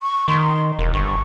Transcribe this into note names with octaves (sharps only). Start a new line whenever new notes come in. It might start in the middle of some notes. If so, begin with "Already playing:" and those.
C#6
D#3 C6
E1 A#4
G1 C#6